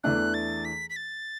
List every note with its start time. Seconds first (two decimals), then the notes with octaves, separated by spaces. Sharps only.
0.04 E2 E3 A3 D4 F#6
0.34 A6
0.65 B6
0.90 B6
0.96 A6